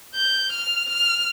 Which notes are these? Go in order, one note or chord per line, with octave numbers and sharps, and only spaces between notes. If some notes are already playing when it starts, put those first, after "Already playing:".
G6
F6
F6